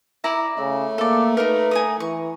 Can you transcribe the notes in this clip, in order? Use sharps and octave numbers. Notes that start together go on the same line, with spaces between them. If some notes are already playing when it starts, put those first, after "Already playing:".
E4 D5 A#5
C#3 A3
A#3 A4 D5
D#4 A#4 B4
G#5 A#5 D#6
E3 C#6